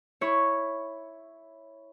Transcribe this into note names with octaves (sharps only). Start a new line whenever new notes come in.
E4 C#5